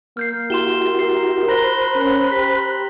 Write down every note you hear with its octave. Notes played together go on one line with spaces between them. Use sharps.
A#3 F6 G6 C7
E4 F#4 G4 C6 E7 G7
A#4 C7
A#4 C5 A#5 B5 F#6 A#6 G7
C#4
G4 B6